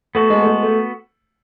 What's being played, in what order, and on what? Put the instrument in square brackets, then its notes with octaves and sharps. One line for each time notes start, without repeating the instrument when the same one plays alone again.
[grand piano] A3 [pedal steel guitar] B3 F#4 A4
[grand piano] G#3
A3
G#3
A3